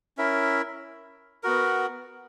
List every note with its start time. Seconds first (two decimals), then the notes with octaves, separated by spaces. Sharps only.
0.18 C#4 E4 A#4 E5
1.43 B3 F#4 A#4